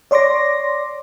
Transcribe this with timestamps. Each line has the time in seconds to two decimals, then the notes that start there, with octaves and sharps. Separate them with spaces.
0.11 C#5 D5 C6 D6 A#6